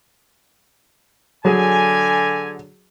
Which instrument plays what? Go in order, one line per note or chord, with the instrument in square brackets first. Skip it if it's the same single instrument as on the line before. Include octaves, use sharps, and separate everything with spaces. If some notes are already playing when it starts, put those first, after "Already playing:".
[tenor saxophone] D3 [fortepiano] F#3 G#4 [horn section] G#5